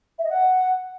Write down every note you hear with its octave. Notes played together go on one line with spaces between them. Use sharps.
E5
D#5
F#5